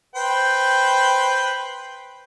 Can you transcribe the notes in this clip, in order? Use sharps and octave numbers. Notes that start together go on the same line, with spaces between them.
B4 C5 G5